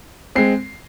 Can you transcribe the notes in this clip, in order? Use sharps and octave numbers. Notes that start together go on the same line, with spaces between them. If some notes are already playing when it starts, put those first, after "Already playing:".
G#3 C4 C7